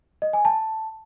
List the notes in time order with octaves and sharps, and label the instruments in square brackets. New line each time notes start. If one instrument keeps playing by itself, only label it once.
[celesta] D#5
G#5
A5